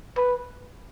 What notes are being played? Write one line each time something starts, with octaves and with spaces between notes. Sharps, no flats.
B4